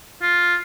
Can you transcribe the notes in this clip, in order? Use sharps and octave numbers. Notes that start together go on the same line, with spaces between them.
F4